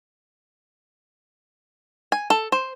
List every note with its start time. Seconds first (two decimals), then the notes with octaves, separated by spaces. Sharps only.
2.12 G#5
2.30 A4
2.52 C5